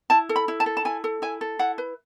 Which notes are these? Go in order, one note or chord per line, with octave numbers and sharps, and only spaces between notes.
E4 A5
A4
B5
E4
A5
A4
A5
E4 G#5
A4
E4 G#5
A4
E4 F#5
B4